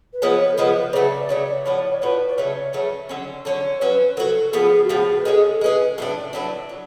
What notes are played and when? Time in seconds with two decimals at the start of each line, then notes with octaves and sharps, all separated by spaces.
0.13 B4
0.22 F3 G#3 B3 C#5
0.40 C#5
0.53 A4
0.57 F3 G#3 B3 B4
0.93 C#3 F#3 A3 D5
1.26 D5
1.29 C#3 F#3 A3 C#5
1.66 A2 F3 B3 F#4
1.77 D5
1.89 C#5
2.02 A2 F3 B3 F#4 B4
2.29 D5
2.38 C#3 F#3 A3 C#4 C#5
2.73 C#3 F#3 A3 C#4
3.09 D3 F#3 C#4
3.45 D3 F#3 C#4 C#5
3.81 F#3 C#4 F#4 B4
4.10 B4
4.17 F#3 C#4 F#4 A4
4.53 A2 F3 B3 G#4
4.84 F#4
4.89 A2 F3 B3 G#4
5.18 B4
5.25 G#3 C#4 G#4 A4
5.44 A4
5.61 G#3 C#4 G#4 B4
5.98 A2 F#3 A3 D4
6.33 A2 F#3 A3 D4
6.69 F#3